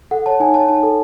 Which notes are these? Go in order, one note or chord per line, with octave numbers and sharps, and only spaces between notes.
A4 F#5
C#5 A5
D#4 G#5
C#5 A5
D#4 A5
A4